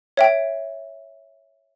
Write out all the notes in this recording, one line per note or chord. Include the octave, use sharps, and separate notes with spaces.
C#5 E5 G5